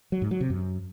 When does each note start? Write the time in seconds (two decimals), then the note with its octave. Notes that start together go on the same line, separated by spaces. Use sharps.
0.12 F#3
0.22 G#2
0.31 F#3
0.41 C3
0.50 F#2